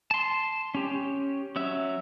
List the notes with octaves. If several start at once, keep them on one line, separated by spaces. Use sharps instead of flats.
A5 C6
C#4 G4
F#3 C#4 E5